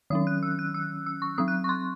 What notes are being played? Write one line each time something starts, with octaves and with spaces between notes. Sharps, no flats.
D#3 F#3 C#4 D#6
F#6
E6
F#6
E6
E6
C#6
F#3 C4 D#6
F#6
C#6
C6